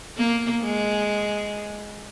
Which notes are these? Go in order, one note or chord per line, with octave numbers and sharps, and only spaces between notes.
A#3
G#3